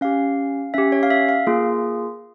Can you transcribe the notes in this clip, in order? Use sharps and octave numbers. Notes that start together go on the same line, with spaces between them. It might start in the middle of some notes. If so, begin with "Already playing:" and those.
C#4 G4 F5
C#4 G4 E5
C#5
F5
E5
F5
A#3 F4 G#4